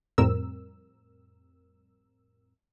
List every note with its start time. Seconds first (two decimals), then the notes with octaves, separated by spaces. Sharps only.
0.18 F2 A2 G3 C4 A#4 E6